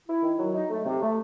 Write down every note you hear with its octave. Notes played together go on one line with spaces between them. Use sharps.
E4
D#3
F#3
D#4
A3
C3
A3